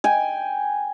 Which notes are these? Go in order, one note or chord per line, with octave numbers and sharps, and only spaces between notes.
G5 G#5